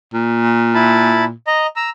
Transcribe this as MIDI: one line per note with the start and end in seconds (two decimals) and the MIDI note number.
0.13 1.32 46
0.75 1.25 64
0.75 1.25 81
0.75 1.25 83
1.47 1.67 75
1.47 1.67 82
1.76 1.90 82
1.76 1.90 88